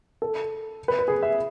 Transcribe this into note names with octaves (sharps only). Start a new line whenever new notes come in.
A4
B4
B4
G#4
E5